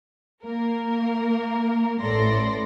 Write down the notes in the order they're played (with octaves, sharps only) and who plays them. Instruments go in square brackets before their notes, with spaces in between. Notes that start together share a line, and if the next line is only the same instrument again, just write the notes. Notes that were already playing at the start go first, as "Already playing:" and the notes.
[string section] A#3 A#4
A1 A2 A4 D5 C6 A#6